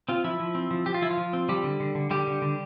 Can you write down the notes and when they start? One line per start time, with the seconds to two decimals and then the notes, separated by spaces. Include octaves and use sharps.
0.09 C4 F4
0.24 F3 E4
0.40 F3
0.55 C4
0.71 F3
0.86 F3 G4
0.94 F4
1.02 F3 E4
1.11 F4
1.17 F3
1.33 C4
1.49 F3 G3 G4
1.64 D3
1.80 D3
1.95 D3
2.11 D3 G3 G4
2.27 D3
2.42 D3